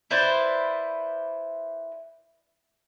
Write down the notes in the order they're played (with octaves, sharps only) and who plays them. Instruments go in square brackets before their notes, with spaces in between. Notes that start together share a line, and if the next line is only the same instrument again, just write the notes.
[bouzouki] E4 B4 C5 D5